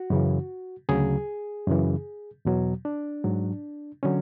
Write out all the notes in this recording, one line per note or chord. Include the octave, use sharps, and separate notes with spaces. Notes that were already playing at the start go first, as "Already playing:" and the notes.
Already playing: F#4
F#2 C#3 E3
D2 C#3 F#3 G#4
F#2 C#3 E3
E2 B2 F#3
D4
G#2 F#3
D3 F#3 C#4